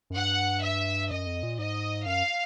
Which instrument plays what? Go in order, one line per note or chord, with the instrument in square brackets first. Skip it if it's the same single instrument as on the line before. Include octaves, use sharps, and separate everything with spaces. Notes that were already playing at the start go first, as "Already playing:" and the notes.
[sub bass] F#2
[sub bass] G2 [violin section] F#5
[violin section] E5
[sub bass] F#2 [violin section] D#5
[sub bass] F2
A#2
[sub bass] G#2 [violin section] D#5
[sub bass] F#2 [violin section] F5